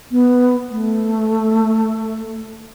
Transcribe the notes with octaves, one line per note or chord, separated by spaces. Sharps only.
B3
A3